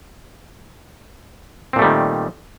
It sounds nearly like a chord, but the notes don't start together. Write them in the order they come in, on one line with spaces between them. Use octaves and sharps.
C4 A#2 A3 G3 D#3